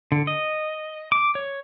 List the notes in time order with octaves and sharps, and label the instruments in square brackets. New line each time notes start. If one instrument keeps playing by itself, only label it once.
[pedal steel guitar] D3
D#5
D6
C#5